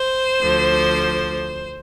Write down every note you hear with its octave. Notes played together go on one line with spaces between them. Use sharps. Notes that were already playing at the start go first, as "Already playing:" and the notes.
Already playing: C5
D2 D3 F3